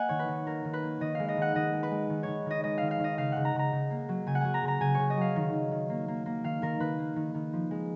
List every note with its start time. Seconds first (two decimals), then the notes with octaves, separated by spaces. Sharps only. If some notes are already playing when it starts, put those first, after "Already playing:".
Already playing: A#3 D#5 F#5 G#5
0.09 D#3 C#5
0.19 B4
0.28 D#3
0.46 A#3 A#4
0.65 D#3
0.73 B4
0.83 A#3
1.01 D#3 D#5
1.15 G#3 F5
1.29 D#5
1.37 D#3 F#5
1.55 D#3 D#5
1.73 G#3
1.83 B4
1.91 G#3
2.10 D#3
2.23 D#3 C#5
2.46 D#3 D#5
2.64 G#3 D#5
2.78 D#3 F5
2.91 F5
2.99 D#3 D#5
3.18 C#3 F5
3.32 C#3 F#5
3.45 A#5
3.54 C#3
3.59 A#5
3.72 C#3
3.91 A#3
4.09 F#3
4.27 C#3 G#5
4.35 F#5
4.41 F#3 G#5
4.54 A#5
4.63 C#3
4.68 A#5
4.80 C#3 G#5
4.95 C#3 C#5
5.10 D#5
5.17 F#3 F5
5.36 D#3
5.53 D#3
5.72 D#3
5.90 A#3
6.08 A#3
6.26 A#3
6.44 D#3 F5
6.62 D#3 A#4
6.80 D#3 B4
6.99 A#3
7.16 D#3
7.35 D#3
7.53 F3
7.71 G#3